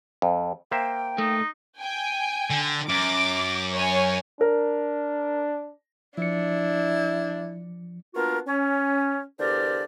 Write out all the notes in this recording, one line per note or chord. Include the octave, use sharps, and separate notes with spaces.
F2
A#3 C5 E5 G5
A3 D#4
G5 G#5
D3
F#2 D6
C#5 G#5
D4 A#4
F3 D4 E4 C#7
A#3 B3 D4 F4 F#4 A#4
C#4
E2 D3 G4 A#4 C5 D5